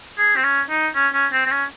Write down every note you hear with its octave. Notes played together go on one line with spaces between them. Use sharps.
G#4
C4
C#4
D#4
C#4
C#4
C4
C4
C#4